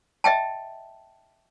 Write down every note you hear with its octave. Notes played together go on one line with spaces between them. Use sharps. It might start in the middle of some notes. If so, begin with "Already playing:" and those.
D#5 E5 G5 A5